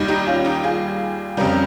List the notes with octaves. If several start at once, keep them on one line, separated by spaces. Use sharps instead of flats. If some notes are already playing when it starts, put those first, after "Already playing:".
Already playing: D#2 D#3 G3
D#4 G4
C#4 F4
D#4 G4
F4 G#4
F2 C#3 G3 G4 A#4